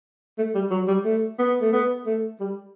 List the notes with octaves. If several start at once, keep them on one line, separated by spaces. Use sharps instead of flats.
A3
G3
F#3
G3
A3
B3
A3
B3
A3
G3